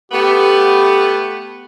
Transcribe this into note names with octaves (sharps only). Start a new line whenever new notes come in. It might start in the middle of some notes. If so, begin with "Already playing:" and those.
A3 B3 G4